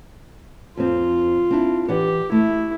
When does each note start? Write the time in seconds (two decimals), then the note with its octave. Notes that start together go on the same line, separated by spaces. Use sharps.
0.77 F2 C4 F4
1.51 C4 D4 E4
1.89 E3 G4 D5 F#5
2.32 A3 E4